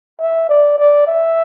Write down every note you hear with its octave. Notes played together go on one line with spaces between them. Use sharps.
E5
D5
D5
E5